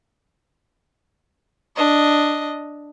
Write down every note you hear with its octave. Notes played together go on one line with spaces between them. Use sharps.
D4 D#5